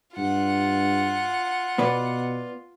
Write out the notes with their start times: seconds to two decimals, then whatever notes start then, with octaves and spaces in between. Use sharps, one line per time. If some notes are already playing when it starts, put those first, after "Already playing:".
0.17 G2 F4 F#5
1.78 B2 B3 B4 D5